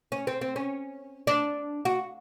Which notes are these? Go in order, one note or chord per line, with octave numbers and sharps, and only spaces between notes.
C#4
C4
C4
C#4
D4
F#4